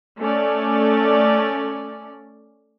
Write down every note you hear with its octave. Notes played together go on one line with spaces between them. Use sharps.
A3 C#4 D5